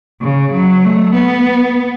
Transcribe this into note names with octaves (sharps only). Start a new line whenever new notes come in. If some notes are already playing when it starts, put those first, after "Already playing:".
C#3
F#3
A3
B3